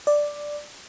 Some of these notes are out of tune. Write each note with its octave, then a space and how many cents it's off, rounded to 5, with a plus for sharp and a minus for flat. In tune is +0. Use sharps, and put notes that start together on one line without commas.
D5 +5